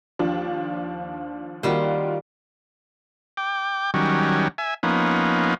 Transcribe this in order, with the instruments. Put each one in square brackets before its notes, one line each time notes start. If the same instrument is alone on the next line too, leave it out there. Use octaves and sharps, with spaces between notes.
[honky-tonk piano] D#2 F3 D4
[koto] D#3 G3 C5 [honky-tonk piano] A#3 F4 F#4
[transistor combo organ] G5 D6
D#3 F#3 G3 C#4
E5 G#5
F3 A#3 B3 C#4 D#4